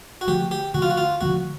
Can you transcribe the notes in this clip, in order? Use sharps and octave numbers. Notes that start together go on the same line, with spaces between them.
F#4
D3 F3 A3 G4
G4
D3 F3 A3 F#4
F4
F#4
F4
D3 F3 A3 F#4